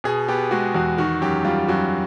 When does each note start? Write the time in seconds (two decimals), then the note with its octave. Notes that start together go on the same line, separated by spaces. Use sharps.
0.04 B2 G#4
0.28 B3 G4
0.51 G#3 F#4
0.74 E2 F#4
0.98 D#3 F#4
1.21 F#2 G4
1.45 G3 F4
1.68 F#2 F#4